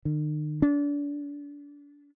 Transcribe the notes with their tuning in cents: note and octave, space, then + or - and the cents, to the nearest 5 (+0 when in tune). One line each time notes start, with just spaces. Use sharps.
D#3 -45
D4 -30